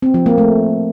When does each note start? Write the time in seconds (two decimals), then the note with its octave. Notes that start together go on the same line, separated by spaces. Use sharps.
0.02 C4
0.14 F3
0.26 A#3
0.38 A3